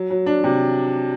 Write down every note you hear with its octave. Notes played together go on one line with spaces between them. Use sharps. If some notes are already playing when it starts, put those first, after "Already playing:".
Already playing: F#3
F#3
D4
C3